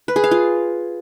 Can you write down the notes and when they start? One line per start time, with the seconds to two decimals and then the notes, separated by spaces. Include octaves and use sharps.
0.08 B4
0.16 G#4
0.24 F5
0.31 F4